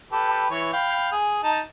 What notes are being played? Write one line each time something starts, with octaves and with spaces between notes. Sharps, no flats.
G4 A4 B4
E3 C#5
F5 G5 B5
G#4
D#4 A5